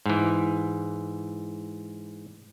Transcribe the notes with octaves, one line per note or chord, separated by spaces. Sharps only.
G#2 E3